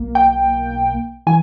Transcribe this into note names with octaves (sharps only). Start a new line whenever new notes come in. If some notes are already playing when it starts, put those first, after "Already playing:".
Already playing: B1 A#3
G5
E3 G#5